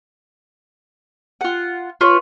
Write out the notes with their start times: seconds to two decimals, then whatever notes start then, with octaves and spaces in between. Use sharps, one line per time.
1.41 F4 F#5
2.01 F4 B4 C#5